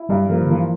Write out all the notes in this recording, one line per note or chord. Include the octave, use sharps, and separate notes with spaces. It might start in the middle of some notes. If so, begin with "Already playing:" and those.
Already playing: E4
G2 G3
F3 A#3
D3
E3 F3